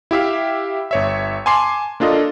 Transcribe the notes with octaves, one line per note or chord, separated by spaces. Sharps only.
E4 G4 E5 F5
G1 C#5 E5
G#5 A5 C6 D6 C7
A#3 D4 F4 A4 D#5